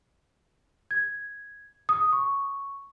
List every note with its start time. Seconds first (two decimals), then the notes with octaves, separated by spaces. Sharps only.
0.91 G#6
1.89 D#6
2.13 C#6